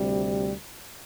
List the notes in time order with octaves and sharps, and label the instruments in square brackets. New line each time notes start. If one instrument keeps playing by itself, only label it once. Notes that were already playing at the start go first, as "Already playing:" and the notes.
Already playing: [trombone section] D2 C3 G3